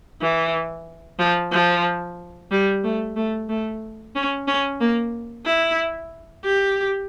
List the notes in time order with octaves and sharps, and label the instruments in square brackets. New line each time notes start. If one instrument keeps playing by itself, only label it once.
[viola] E3
F3
F3
G3
A3
A3
A3
C#4
C#4
A#3
E4
G4